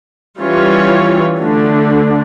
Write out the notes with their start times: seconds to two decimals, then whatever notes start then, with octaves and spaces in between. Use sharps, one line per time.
0.40 E3 G3 C#4 F4 C#5
1.39 D3 A3 D4